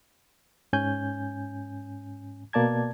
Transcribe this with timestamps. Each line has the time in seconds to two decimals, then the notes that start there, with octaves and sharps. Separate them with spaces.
0.73 G#2 C#4 G#5 G6
2.53 B2 A#3 D5 A5 G#6